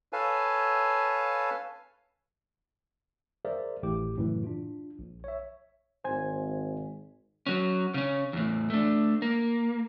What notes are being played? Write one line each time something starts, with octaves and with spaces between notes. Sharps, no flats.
A4 B4 C#5 F5 G#5 A5
G#4 A#4 C5 D5 E5 F5
G#1 A2 E3 G4 D6
F#2 A2 C#3 E3
D4 F4
A#1
C#5 E5
G#1 C5 G#5 G#6
F#3 C#4
C#3 C#4
E2 A2
A3 D4
A#3